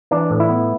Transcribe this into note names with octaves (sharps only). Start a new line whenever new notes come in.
E3 D4
A2
E4
B3